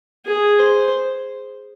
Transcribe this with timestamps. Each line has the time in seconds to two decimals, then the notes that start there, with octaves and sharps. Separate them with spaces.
0.26 G#4
0.60 C5